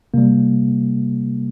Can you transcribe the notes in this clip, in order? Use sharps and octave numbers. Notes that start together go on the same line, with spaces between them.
C3 G3 A#3